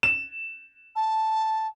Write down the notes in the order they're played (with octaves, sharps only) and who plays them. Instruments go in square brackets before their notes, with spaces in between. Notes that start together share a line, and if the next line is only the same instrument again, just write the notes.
[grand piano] E7
[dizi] A5